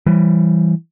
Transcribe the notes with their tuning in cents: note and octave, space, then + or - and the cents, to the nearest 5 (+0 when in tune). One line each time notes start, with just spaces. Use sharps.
E3 +15 G3 +0